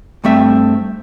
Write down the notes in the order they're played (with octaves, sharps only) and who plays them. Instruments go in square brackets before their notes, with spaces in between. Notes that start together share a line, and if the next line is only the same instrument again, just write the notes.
[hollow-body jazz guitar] G2 A3 C4 E5